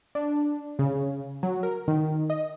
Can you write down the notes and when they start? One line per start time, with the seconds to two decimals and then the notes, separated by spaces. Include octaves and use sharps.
0.15 D4
0.79 C#3
1.43 F#3
1.63 A#4
1.88 D#3
2.30 D#5